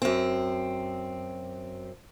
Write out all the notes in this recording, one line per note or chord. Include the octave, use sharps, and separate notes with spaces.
F#2 C4